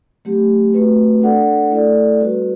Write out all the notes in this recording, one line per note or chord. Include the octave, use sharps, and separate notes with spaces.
F#3 A3 C4 G4
A3 C4 F#4 B4
D4 A4 D5 F#5
A3 E4 A4 D5
G3 C4 F#4 B4